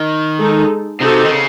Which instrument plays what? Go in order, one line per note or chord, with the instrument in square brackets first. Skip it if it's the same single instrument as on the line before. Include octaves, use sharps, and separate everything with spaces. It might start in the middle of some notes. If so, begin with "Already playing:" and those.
Already playing: [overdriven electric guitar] D#3
[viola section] G#3 D#4 A4
[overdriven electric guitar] C3 [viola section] C4 D#4 F#4 A4
[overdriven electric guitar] D#3
C#3